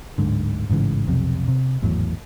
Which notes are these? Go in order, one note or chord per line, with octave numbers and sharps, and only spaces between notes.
D1 G#2 D3
A1 G#2 C#3 E3
B1 F2 C3
C3
G#1 E2 A2 F#3